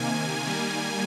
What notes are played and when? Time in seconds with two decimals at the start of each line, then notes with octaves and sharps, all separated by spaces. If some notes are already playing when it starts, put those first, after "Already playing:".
Already playing: C3 D#3 A#3 G#5
0.45 D#3 G3 A#3